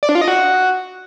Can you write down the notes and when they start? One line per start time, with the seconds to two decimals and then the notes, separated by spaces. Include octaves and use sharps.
0.03 D5
0.09 D4
0.15 F4
0.21 D#5
0.28 F#4